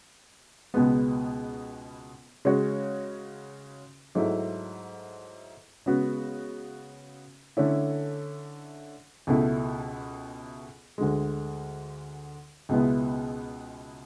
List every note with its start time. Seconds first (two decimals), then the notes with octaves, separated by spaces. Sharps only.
0.74 C#2 B2 G#3 B3
2.45 C#3 G#3 C#4 F#4 C#5
4.15 G#2 F#3 A3 E4
5.86 C#3 G#3 B3 F#4
7.57 D3 A3 C#4 E4
9.27 C#2 B2 A3 E4
10.98 D2 D3 G#3
12.69 C#2 B2 G#3 B3 E4